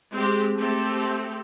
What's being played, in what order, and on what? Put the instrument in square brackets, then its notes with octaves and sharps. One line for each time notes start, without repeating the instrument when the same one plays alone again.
[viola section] G#3 C4 G4
A3 C4 G4 A4